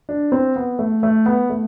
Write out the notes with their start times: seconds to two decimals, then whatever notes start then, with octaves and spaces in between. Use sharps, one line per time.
0.09 D4
0.32 C4
0.56 B3
0.79 A3
1.03 A3
1.26 B3
1.50 A3